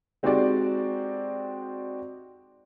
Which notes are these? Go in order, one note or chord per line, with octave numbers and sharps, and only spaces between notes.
G#3 C4 D#4 F#4 G4 D5